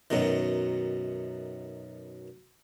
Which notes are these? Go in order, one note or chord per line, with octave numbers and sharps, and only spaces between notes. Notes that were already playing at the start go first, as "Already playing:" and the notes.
F#2 B2 D#3